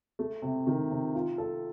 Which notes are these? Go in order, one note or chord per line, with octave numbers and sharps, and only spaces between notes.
A3
C3
D#3
C3
F4
A4